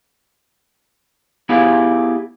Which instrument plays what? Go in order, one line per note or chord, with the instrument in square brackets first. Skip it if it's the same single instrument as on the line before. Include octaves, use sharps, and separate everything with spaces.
[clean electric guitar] B3 E4 G4 G#4 F5